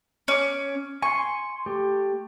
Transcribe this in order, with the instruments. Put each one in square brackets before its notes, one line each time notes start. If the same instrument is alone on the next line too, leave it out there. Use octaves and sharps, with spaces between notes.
[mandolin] C#4 D6
[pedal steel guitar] G#5 C6 [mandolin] C#6
[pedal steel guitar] A3 G4